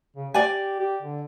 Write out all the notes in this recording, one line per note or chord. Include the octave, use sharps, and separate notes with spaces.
C#3
G4 D5 G#5
G4
D3